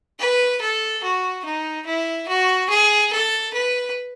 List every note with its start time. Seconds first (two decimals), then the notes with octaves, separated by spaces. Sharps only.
0.19 B4
0.61 A4
1.03 F#4
1.45 D#4
1.86 E4
2.28 F#4
2.69 G#4
3.12 A4
3.53 B4